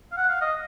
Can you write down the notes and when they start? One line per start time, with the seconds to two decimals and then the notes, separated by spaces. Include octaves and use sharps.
0.12 F5
0.17 F#5
0.29 F5
0.41 D#5